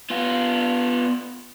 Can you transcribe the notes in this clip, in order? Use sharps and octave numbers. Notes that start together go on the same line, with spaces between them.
B3 F4